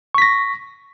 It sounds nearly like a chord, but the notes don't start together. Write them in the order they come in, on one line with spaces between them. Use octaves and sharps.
C#6 B6 A#6